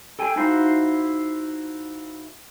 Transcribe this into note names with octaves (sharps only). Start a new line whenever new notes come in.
A4 G5 G#5
D#4 E4 F#4 C5 F5